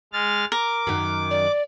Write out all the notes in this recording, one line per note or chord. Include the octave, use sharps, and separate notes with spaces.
G#3 F6 A6
A#4 D6
F#2 D#3
D5